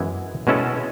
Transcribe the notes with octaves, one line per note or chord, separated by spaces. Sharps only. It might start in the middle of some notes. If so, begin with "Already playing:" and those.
Already playing: F#2 E3 G#3 B3 E4
B2 G#3 C#4 E4 A4